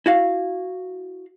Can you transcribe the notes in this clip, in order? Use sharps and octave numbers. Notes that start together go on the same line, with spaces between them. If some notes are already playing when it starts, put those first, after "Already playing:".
E4 F#4 F5